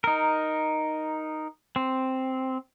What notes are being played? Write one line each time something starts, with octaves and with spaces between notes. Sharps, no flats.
D#4 A#4
C4